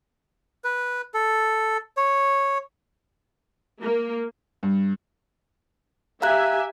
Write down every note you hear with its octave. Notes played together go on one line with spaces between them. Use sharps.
B4
A4
C#5
A#3
G2
G4 E5 F5 G#5 A#5 F#6